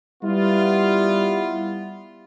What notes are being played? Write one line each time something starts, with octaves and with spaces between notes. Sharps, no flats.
G3 B3 E4 F4